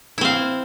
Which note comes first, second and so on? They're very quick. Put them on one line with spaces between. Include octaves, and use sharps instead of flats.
E4 C4 F5